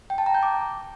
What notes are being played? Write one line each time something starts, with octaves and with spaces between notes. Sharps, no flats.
G5
A5
A#5
G6
D6